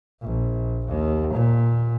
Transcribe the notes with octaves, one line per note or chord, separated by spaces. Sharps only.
A#1
D#2
A#2